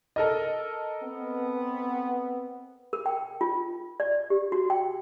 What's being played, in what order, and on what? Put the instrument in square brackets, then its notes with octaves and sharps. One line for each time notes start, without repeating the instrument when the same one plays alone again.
[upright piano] A4 A#4 D#5
[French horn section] B3 C4
[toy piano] A#4
G5
F4
D5
G4
F#4
G5